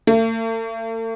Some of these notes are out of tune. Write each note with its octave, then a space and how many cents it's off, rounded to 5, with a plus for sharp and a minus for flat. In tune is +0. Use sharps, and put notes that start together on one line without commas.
A3 +45